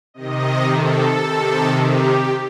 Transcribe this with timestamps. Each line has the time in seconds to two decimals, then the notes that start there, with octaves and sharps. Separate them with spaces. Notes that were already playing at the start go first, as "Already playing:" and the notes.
0.14 C3 D#3 D#5
0.70 A4
1.23 C3 D#3
1.79 G4